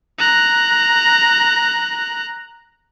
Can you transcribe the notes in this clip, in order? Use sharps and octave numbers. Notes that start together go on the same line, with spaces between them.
A#5 F#6